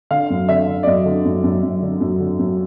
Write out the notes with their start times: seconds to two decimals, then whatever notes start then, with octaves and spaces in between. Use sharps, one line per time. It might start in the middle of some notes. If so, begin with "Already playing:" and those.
0.11 D3 F5
0.30 F#2
0.49 D3 E5
0.68 D3
0.83 D5
0.87 F#2 D#5
1.06 D3
1.25 F#2
1.44 F#2
1.63 F#2
1.82 D3
2.01 F#2
2.20 D3
2.39 F#2